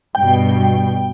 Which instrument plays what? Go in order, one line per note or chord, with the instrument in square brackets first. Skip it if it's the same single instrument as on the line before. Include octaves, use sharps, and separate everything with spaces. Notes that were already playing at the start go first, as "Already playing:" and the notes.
[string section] G2 B2 [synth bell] G5